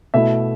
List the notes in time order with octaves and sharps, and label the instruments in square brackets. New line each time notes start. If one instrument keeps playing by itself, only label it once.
[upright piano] B2 A3 E4 [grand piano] E5